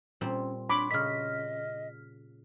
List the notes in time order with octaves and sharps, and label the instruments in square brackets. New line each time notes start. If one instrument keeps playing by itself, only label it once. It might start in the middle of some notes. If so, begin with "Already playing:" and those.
[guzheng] A#2 G3 C4 [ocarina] C#4
[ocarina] D4 [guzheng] C#5 C6 [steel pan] B5 D6
[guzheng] A#2 C#3 [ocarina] D#5 [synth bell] F6 B6